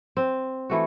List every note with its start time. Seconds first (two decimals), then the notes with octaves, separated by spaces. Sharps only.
0.17 C4
0.70 E3 A3 F#4